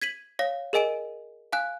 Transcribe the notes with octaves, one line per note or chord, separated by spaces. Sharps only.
G#6 B6 D#7 F#7
C#5 F5 A#6
G#4 A#4 D#5 G#5 D7 D#7
F5 G#5 F#6